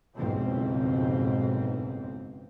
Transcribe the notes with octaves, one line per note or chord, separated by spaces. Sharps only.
F#1 B1 F2 G#2 B2 C4